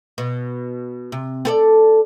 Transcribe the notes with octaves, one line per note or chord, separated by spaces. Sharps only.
B2
C3
C4 A4 D5